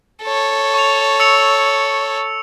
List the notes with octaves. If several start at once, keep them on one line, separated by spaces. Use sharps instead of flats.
A4 C#5
C#6 F7
E6 C#7 F7